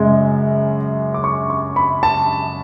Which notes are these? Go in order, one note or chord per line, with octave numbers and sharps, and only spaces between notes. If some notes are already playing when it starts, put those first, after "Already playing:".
Already playing: F#2 C#3 G#3
D6
C#6
C#6
B5
A5